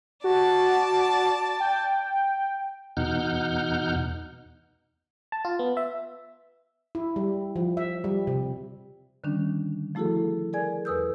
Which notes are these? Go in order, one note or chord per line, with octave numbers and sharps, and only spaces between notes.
F#4 D5 A5
G5
E2 B2 D#4 F#5 F6 G6
A5
F4
B3
E5
E4
G3
F3
E5
G3
C3
D3 D#3 G3 C#4 D4
F3 A3 E4 F#4 G#4 A4
G#4 A#4 D5 G#5 G#6
E2 A4 B4 D#6 E6 G6